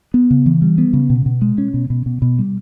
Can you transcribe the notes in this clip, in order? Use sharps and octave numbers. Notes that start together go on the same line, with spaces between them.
B3
C#3
E3
G3
B3
C#3
B2
B2
G#3
C#4
B2
B2
B2
B2
G3